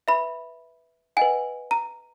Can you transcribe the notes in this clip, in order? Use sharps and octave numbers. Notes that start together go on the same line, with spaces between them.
B4 E5 B5
B4 D#5 F#5 G#5
A#5